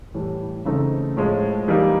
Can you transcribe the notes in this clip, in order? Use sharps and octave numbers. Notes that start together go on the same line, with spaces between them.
A2 E3 G3
C#3 E3 A3 C4 D#4
A2 F3 G#3
E3 G3 A#3 D#4